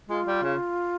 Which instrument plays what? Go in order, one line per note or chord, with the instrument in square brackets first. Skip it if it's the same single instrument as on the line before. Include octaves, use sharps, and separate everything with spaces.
[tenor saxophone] G#3 [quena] F4
[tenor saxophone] G3
C#3